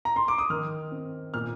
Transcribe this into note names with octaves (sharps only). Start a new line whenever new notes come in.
A#5
C6
D6
D#6
D#3 F6
C4
A#2 F6